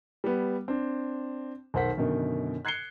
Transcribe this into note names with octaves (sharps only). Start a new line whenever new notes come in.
G3 B3
C4 D4
B1 D#3 C5 F#5 B6
F#2 B2 D3 D#3
F#6 G#6 C7 C#7 G7